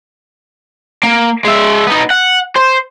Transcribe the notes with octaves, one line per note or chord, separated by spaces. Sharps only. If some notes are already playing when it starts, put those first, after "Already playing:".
A#3
G#3 E5
B3 D#4
F#5
C5